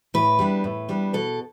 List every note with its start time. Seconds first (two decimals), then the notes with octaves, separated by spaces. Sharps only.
0.14 A2 B4
0.39 G3 B3 D4
0.64 A2
0.89 G3 B3 D4
1.13 B2 A4